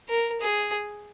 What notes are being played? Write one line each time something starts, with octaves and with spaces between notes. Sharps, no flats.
A#4
G#4